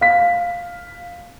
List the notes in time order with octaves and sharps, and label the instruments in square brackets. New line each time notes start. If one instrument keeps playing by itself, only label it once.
[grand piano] F5 B6